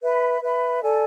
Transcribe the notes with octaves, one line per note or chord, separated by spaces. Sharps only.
B4 E5 B5
B4 E5 B5
A4 D5 G#5